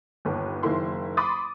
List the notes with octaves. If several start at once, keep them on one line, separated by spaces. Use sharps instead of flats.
G1 D#2 B4
F#1 D#3 A#3 E4 C6
B5 C6 D6 D#6 A6